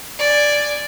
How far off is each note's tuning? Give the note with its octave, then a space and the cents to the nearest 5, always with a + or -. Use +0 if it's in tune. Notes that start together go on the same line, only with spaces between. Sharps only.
D5 +0 G#5 +0